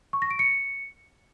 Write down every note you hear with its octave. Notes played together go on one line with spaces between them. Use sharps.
C#6
A#6
D7
C#7